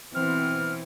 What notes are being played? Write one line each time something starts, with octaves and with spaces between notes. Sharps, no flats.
B2 E3 B3 C4 F6